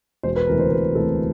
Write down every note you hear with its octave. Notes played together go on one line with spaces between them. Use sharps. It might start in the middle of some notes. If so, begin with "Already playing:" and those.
E1 C5
B4
D2 C3 E3 A#4
C5
E1 B4
D2 C3 E3 A4